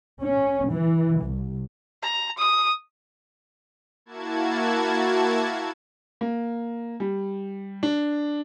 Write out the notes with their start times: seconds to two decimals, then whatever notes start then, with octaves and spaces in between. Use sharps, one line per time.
0.22 C#4
0.70 E3
1.21 C2
2.02 A#5
2.38 D#6
4.06 A#3 E4 F#4 A5 G#6
6.21 A#3
7.00 G3
7.83 D4